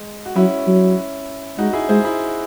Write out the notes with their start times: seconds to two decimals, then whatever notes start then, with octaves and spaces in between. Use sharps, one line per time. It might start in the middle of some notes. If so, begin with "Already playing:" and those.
Already playing: G#3
0.26 F#4
0.36 F#3 C#4 E4
0.67 F#3
1.58 G#3 D#4 F#4
1.73 E4 G#4
1.89 G#3 G#4 C5
2.04 E4 G#4